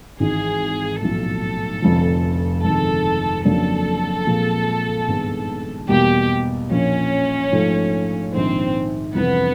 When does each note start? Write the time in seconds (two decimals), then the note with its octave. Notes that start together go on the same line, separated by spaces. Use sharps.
0.19 G#1 G#2 E3 G#4
1.00 B1 A2 F3 A3 A4
1.82 F1 F2 D3 F3
2.63 G1 F2 C3 D#3 G#3 A4
3.45 F2 C#3 F#3 A#3 D4 A4
4.27 A#2 F3 G#3 C4
5.08 G#1 G2 D#3 G#3 B3
5.89 E2 B2 G3 A#3 G4
6.70 A#1 A#2 F3 A#3 C#4
7.52 G#2 F3 A3
8.33 A#1 G#2 D#3 C4
9.15 F2 C3 E3 G3 B3